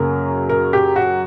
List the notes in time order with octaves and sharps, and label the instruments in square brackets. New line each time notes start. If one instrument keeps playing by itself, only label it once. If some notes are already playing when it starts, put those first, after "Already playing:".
Already playing: [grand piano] F#2 C#3 F#3 A#3 [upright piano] A#4
[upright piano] A#4
G4
F#4